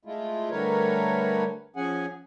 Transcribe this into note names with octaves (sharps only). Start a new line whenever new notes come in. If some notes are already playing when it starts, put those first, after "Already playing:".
G#3 A3 E4 F4
D3 G3 A3 A#4 B4 C#5
F3 C#4 G#4 F#5 G#5